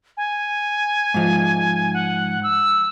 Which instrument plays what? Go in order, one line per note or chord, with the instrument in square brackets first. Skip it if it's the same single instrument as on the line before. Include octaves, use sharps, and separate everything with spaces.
[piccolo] G#5
[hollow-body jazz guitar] G#2 F3
[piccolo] F#5
E6